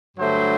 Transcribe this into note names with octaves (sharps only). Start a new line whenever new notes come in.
G2 D3 F#3 A3 C5